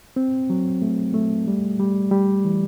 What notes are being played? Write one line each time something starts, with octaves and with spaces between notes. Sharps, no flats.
C4
F#3
A3
A3
G3
G3
G3
E3